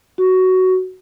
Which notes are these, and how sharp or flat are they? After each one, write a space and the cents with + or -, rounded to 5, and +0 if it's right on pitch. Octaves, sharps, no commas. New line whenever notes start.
F#4 +10